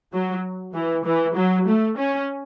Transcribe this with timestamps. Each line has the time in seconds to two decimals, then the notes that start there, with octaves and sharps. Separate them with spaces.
0.12 F#3
0.73 E3
1.04 E3
1.35 F#3
1.66 A3
1.97 C#4